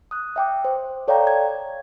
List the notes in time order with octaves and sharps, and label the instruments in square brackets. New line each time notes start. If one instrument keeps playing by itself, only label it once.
[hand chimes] D#6 F#6
E5 G5 D6
C5
A4 C#5 D5 F5 G5 A#5
G#6